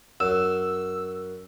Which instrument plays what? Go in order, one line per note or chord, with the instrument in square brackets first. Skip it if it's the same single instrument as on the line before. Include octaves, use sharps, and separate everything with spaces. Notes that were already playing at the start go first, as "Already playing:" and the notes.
[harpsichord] F#2 [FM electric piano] E6